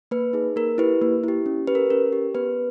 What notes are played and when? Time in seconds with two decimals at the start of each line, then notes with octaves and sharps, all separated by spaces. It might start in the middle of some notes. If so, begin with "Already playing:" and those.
0.11 A#3 B4
0.33 D#4 G#4
0.56 A#3 A#4
0.78 E4 G4 B4
1.02 A#3
1.24 E4 G4
1.46 C#4
1.67 G4 B4
1.75 A#4
1.90 C#4 A#4
2.13 G4
2.35 B3 B4